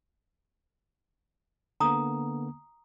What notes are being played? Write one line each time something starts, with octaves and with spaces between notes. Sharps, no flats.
D3 A#3 B3 A#5 D#6